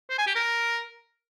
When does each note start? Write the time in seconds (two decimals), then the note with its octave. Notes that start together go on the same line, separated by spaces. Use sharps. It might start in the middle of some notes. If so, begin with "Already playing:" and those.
0.10 C5
0.18 G#5
0.27 G4
0.36 A#4